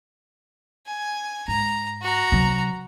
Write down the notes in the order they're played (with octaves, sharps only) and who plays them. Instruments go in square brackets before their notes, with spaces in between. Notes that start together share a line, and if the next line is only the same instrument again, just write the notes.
[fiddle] G#5
[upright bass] G#2 [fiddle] A#5
[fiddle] F#4 A#5
[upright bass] C3 F#3